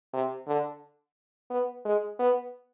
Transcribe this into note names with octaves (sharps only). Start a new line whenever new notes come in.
C3
D3
B3
G#3
B3